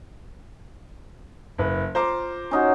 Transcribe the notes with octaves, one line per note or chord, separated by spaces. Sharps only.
F#1 B4
F4 C5 A#5 D6
C#4 D#4 F#4